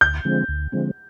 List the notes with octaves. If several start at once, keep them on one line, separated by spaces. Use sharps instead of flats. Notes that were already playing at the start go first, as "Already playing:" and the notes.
D2 G6
D3 F3 G#3 C4
D2
D3 F3 G#3 C4